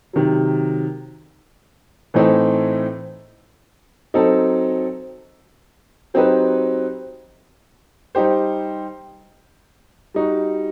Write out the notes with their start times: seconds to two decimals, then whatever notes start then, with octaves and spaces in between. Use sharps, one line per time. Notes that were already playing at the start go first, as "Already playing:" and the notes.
0.13 C3 D#3 F#3
2.14 A2 E3 A3 C4 D#4
4.14 F#3 C4 D#4 A4
6.14 F#3 C4 D#4 G4 B4
8.15 G3 D#4 G4 C5
10.14 G3 D#4 F#4